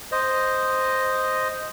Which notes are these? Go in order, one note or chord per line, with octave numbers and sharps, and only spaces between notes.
C5 D#5